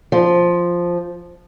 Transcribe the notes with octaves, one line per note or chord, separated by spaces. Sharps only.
F3